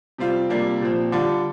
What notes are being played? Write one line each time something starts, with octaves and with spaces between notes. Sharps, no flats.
C3 G3 C4 F4
C3 G3 A#3 D4 F4
A#2 F3 C4
D3 G3 D4 F4